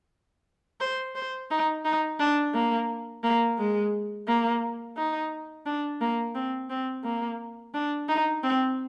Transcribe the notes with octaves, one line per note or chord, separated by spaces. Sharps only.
C5
C5
D#4
D#4
D4
A#3
A#3
G#3
A#3
D#4
D4
A#3
C4
C4
A#3
D4
D#4
C4